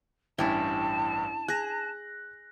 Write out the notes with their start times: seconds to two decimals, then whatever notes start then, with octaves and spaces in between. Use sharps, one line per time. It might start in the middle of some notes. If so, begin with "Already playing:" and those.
0.38 A1 G2 C#4 D4 E4 G5 A5
1.48 G#4 F#6 A#6